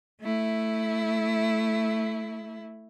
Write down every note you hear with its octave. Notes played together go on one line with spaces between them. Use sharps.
A3 E4